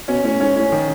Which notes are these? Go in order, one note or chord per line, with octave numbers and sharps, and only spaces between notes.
B2 C#4
A2 C#4
G#2 C#4
A2 C#4
D#3